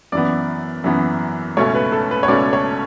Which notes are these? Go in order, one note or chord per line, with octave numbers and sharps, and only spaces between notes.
F#2 E3 B3 D5
F#2 E3 B3
C#2 B2 A3 C#4 C#5
B4
A4
B4
C#5
C#2 B2 A3 C#4 D5
C#5